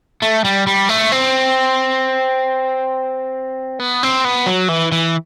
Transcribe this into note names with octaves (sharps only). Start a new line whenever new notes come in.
A3
G3
G3
A3
C4
B3
C4
B3
F#3
E3
E3